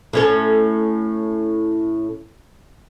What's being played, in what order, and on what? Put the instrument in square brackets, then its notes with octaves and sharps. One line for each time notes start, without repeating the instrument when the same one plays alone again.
[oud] A2 C#4 A4